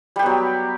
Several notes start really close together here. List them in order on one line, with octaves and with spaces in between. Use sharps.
G3 G4 B3 F#3